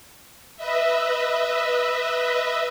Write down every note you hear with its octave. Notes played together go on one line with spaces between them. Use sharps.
B4 D#5 E5